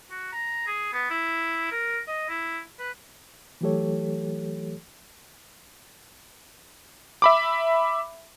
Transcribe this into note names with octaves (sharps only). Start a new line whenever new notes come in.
F#4
A#5
G#4
B3
E4
A#4
D#5
E4
B4
E3 F#3 A3 G4 A4 C#5
E5 B5 D6